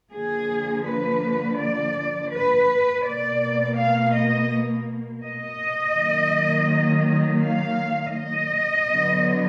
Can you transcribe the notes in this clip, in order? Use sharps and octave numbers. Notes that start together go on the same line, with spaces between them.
D3 F3 A#3 G#4
B4
D5
B4
B2 A#3 D5
F5
D#5
D#5
D#3 F#3 A#3
F5
D#5
D3 F#3 B3